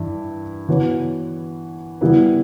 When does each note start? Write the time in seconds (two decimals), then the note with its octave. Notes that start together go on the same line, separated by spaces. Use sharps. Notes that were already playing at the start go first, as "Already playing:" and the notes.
Already playing: G2 E3 E4
0.69 E3 B3 F#4 C#5
2.01 E3 G3 B3 E4 B4